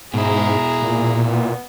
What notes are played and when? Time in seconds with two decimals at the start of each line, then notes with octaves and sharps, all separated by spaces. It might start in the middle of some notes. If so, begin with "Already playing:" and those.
0.14 G#2 B2 E4 G#4 A#5
0.82 A#2
1.29 B3